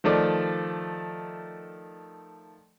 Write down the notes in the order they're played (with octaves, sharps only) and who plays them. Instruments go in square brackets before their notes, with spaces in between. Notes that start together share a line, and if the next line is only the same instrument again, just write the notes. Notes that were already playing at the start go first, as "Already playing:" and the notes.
[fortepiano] D#3 F3 A3 D5